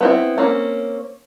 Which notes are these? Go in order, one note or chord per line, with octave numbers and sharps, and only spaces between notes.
B3 C4 E4
A#3 C4 C#4